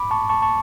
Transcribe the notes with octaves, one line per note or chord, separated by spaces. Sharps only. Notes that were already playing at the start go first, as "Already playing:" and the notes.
Already playing: B5 D6
A5 C#6
A5 C#6
A5 C#6